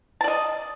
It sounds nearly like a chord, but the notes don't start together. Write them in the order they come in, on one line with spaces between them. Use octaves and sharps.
A5 D5 D#5